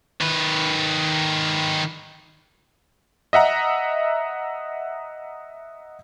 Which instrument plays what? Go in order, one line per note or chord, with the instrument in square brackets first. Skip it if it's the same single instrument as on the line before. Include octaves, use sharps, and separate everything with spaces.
[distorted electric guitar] D#3 B4
[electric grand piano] D#5 E5 F#5 A#5